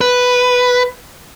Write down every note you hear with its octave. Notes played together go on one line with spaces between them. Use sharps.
B4